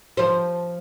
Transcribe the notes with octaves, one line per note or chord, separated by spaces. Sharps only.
F3 C5